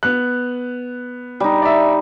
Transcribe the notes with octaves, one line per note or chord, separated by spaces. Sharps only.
B3 F#6
G3 D#4
D5 E5